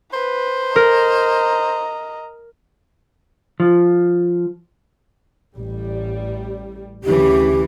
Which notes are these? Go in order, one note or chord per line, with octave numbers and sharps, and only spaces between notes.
B4 C5
A#4 D#5 A#5
F3
A1 G3
D2 C#3 E3 G4